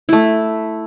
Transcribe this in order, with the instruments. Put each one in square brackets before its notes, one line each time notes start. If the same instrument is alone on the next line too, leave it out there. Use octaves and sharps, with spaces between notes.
[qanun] A3 E4